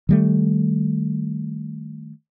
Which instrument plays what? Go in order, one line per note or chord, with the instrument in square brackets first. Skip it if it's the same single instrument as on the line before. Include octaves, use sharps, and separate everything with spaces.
[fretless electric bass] D#3 G3 A3